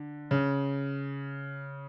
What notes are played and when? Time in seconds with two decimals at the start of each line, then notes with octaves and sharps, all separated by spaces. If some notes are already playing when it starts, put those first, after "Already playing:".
Already playing: D3
0.31 C#3